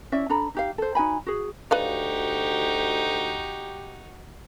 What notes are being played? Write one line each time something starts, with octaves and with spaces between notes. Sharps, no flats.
C#4 E4 D5 E5
D4 A4 A#5 B5
D#4 G4 F5
A4 C5
D#4 F#4 G#5 B5
F#4 G#4
D2 D#4 F#4 G4 B4 D5 F5